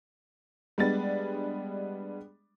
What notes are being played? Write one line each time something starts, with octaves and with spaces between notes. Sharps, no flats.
G3 G#3 B3 D4 A6